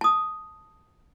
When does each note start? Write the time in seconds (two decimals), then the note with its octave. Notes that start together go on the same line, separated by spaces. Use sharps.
0.01 A5 D#6